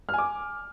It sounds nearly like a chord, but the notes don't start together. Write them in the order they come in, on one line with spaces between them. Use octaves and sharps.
F6 G#5 D6